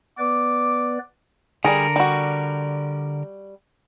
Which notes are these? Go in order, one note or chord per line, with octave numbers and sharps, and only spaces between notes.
B3 B4 D5 D6
D3 G3 G#4 A#4
G3 F#4